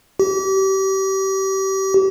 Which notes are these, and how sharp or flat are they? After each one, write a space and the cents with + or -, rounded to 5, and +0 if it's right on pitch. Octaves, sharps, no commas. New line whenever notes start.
G4 -30